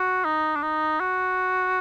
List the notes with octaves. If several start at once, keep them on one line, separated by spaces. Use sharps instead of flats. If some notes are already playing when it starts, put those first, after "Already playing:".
Already playing: F#4
D#4
D4
D#4
F#4